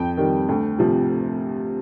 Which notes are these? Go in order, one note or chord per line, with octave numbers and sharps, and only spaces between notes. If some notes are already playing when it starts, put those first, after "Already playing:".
Already playing: F2 G5
D#3 G3
D2
C3 F3